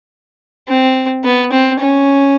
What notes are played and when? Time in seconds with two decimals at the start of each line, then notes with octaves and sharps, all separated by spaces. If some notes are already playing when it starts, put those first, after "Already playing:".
0.68 C4
1.25 B3
1.52 C4
1.80 C#4